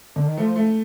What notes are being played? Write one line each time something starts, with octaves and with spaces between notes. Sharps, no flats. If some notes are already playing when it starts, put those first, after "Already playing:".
D3
D#3
F3 A3
A3